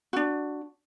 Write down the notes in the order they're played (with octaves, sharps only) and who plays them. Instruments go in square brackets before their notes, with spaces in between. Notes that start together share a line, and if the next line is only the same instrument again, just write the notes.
[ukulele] D4 F#4